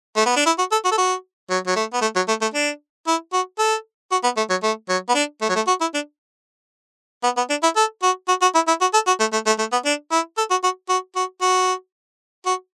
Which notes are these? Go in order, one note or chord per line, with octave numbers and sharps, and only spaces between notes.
A3
B3
D4
E4
F#4
A4
F#4
A4
F#4
F#3
F#3
A3
B3
A3
F#3
A3
A3
D4
E4
F#4
A4
F#4
B3
A3
F#3
A3
F#3
B3
D4
A3
F#3
A3
F#4
E4
D4
B3
B3
D4
E4
A4
F#4
F#4
F#4
E4
E4
F#4
A4
F#4
A3
A3
A3
A3
B3
D4
E4
A4
F#4
F#4
F#4
F#4
F#4
F#4